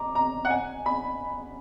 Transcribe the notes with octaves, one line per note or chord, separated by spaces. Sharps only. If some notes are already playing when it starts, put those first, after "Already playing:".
Already playing: A#5 D6
A#5
F#5
G#5
B5